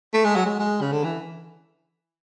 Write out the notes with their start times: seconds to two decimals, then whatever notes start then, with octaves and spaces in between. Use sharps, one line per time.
0.14 A3
0.25 G#3
0.36 F#3
0.46 G#3
0.59 G#3
0.81 C#3
0.92 D3
1.04 E3